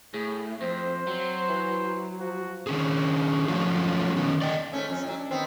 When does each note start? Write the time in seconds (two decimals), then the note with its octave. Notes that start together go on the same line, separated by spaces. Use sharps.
0.14 A2 G#4
0.61 F2 C4 C5
1.07 F#3 C4
1.49 E3
2.20 F3 F#4
2.67 D#3 C#4 G#4
3.48 F3 F#3 A3 C#4 F4 F#4
4.16 D#3 B3 C#4
4.42 D5 D#5 G5
4.73 G#2 A3 C#4
4.90 F2 C#4
5.04 A2 F#3
5.19 D4
5.31 D#3 B3 C4